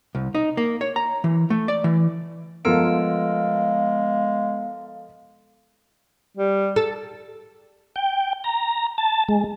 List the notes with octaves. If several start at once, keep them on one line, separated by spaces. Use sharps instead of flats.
C2
D#4
A#3
C#5
A#5
E3
A3
D5
E3
F3 G#3 A3 B3 A#4 F5 E6 D7
G3
A4
G5
A#5
A5
G#3